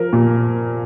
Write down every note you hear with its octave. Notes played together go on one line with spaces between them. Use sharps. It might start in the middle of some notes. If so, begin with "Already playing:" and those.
Already playing: F3 A#4
A#2